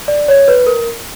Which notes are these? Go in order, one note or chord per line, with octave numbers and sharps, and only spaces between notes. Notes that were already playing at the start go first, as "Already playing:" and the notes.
D5
C#5
B4
A#4